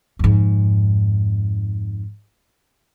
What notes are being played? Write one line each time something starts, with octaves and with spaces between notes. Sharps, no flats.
F2 G#2